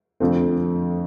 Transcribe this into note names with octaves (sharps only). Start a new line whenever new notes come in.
F2 D3 F3 A3 C4